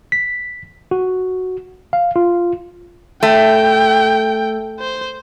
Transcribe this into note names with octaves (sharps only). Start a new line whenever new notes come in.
B6
F#4
F5
F4
A3 G5
C5